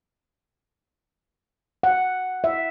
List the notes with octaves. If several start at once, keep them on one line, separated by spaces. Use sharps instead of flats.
F#5
E5